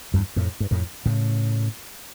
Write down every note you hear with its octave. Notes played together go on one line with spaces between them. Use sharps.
E2 G2
F2 A2
G2
F2 A2
A2 C#3